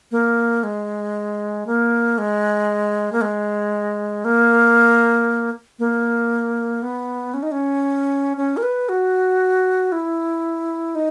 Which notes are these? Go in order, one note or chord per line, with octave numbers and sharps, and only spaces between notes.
A#3
G#3
A#3
G#3
A#3
G#3
A#3
A#3
B3
C#4
D#4
C#4
C#4
A#4
B4
F#4
E4
D#4